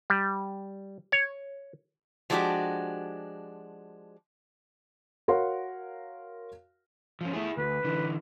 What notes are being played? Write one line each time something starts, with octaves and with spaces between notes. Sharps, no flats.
G3
C#5
F3 F#3 G#3 D4 F#4 G4
F#4 A#4 C#5 F5 F#5 C6
F3 C#4
A3 E4 G#4
D2 B4
D3 E3